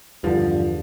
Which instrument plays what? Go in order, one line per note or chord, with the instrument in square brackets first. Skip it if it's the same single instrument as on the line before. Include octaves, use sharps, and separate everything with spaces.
[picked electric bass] E2 D3 [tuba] G2 [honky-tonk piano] F3